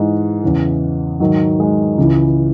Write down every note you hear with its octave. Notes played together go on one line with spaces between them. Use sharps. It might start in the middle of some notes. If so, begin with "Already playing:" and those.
Already playing: G#2 E3 G#3
E2 C#3 E3
G#2 D#3 F#3
G#3
C#2 C#3 E3